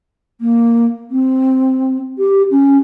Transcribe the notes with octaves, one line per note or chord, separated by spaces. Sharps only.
A#3
C4
G4
C#4